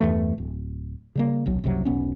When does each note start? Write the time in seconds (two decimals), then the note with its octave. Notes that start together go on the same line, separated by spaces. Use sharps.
0.01 E2 G2 E3 A3
0.38 D1
1.15 C#3 G3 A#3
1.46 D#1 B1 F#3
1.64 F#1 C2 C3 F#3
1.85 E1 B1 B3 C#4